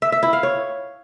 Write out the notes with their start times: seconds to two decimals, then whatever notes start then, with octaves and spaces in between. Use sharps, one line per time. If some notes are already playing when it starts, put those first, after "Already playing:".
0.02 E5
0.12 E5
0.23 E4
0.33 F5
0.43 C#5